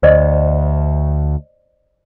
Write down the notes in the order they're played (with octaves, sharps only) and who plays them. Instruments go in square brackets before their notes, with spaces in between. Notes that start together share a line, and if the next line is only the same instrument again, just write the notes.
[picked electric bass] D2 [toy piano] C5 D5 D#5